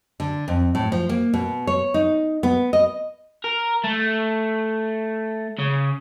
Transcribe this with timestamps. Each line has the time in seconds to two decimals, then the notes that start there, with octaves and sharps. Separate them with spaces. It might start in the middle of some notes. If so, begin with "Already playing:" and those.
0.20 D3
0.48 F2
0.75 A2
0.92 F3
1.09 A#3
1.33 B2
1.67 C#5
1.94 D#4
2.43 B3
2.73 D#5
3.44 A#4
3.84 A3
5.59 C#3